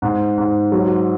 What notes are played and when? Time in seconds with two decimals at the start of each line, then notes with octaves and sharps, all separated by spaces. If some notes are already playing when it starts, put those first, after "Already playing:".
0.02 G#2
0.38 G#2
0.72 F#3